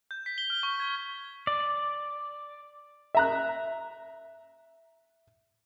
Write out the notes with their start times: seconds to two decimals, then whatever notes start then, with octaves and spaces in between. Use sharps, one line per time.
0.11 G6
0.26 B6
0.38 G7
0.50 F6
0.63 C#6
0.80 G#6
1.47 D5
3.15 E5 A#5 F#6